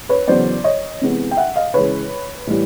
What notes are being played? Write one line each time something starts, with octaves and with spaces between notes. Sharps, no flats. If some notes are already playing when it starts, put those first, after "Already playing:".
B4 C#5
E2 C#3 F#3 B3 C5 D5
C#5 D#5
C3 E3 G#3 B3
G5
E5 F#5
D#5 F5
C#3 E3 G#3 B4 C#5
A2 E3 G3